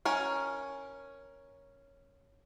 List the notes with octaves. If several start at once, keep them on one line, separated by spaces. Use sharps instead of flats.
C#4 A#4 G#5